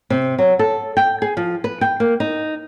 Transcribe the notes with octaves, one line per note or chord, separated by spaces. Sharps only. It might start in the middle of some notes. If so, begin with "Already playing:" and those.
C3
F#3
A4
G5
G#4
F3
B4
G5
A#3
D#4